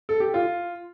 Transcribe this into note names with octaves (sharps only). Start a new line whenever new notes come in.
A4
G4
F4